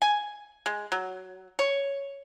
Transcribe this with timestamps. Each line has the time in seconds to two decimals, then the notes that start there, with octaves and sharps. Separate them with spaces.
0.02 G#5
0.66 G#3
0.92 F#3
1.59 C#5